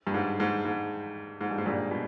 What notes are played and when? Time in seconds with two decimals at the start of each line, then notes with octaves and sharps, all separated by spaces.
0.07 G2
0.14 G#2
0.40 G#2
0.65 G#2
1.41 G#2
1.51 G2
1.58 G#2
1.66 G2 A#2
1.91 B2